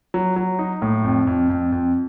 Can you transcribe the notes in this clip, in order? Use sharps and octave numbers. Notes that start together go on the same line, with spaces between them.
F#3
F#3
D#4
A2
F2
F2
F2
F2